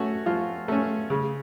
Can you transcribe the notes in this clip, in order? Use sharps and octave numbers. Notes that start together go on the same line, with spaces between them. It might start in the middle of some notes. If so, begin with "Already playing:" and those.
Already playing: A3 C#4 F#4
F3 F4
A3 C#4
C#3